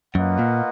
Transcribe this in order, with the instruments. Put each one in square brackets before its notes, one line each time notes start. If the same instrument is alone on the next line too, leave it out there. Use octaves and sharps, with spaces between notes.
[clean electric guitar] F#2 [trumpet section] A#3 F4 B4 D#5 F#5
[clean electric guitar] A#2